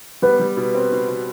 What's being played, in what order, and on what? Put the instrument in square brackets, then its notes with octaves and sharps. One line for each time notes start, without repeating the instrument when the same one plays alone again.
[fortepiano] G3 [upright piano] B3 B4
[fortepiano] G3
B2
C4
B2
B2